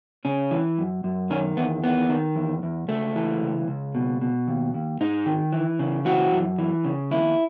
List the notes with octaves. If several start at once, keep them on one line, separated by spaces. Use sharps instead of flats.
C#3 C#4
E3
F#2
F#2
D#3 C#4
E2 B3
D#3 B3
D#3
E2
E2
C#2 A3
E3
C#2
C#2
B2
B2
D#2
D#2
G#2 D#4
D#3
E3
C#3
E3 F#4
F#2
E3
C#3
D#2 E4